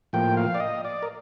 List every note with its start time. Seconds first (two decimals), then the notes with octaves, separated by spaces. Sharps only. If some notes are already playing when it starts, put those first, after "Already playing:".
0.13 A2 F3 A#3 G5
0.37 F5
0.55 D5
0.60 D#5
0.85 D5
1.03 A#4